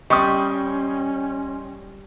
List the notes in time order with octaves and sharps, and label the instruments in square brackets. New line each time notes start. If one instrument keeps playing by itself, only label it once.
[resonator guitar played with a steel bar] G3 [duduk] C#4 [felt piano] D#5 G5 C6 [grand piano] C#6 D#6